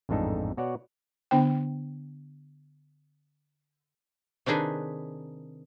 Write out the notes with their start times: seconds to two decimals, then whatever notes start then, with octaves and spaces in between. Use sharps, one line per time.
0.09 A1 F2 G#2 D4 D#4 A4
0.57 B2 F#4 C#5 D5 F#5
1.31 D3 B3 D4 C5 G5
4.46 C3 D#3 D4 G#4 B4